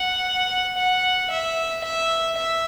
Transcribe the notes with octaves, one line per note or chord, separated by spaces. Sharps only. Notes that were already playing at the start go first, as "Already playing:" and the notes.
Already playing: F#5
F#5
E5
E5
E5